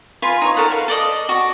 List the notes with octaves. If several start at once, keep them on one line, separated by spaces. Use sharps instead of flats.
F4 B4 G#5 C6
D#4 C#5
A4 A#4 F#5
B4 F5
A4 D5 D#5
F#4 D5